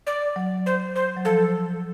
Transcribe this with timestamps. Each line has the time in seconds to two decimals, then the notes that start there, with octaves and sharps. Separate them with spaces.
0.07 D5
0.36 F#3
0.66 C5
0.96 C5
1.17 F#3
1.25 F3 A4